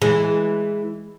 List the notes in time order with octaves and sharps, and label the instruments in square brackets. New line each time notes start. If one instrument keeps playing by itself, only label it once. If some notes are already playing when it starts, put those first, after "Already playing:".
[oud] E3 G#3